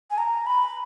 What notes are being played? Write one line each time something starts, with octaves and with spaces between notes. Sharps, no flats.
G#5
A#5
B5